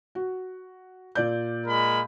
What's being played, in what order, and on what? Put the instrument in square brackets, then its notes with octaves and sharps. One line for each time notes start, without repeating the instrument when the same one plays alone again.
[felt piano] F#4
A#2 D5 G6
[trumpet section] G#3 A#4 B5